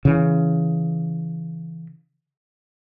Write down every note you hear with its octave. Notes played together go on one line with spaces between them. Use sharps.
C#3 E3